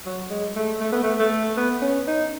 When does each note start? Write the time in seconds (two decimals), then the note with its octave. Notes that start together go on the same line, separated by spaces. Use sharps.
0.06 F#3
0.30 G#3
0.56 A3
0.81 A3
0.92 B3
1.03 A3
1.19 A3
1.57 B3
1.82 C#4
2.07 D#4